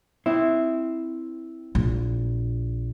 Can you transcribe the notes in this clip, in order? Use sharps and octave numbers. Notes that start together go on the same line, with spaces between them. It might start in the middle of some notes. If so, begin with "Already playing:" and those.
C4 E4
A#1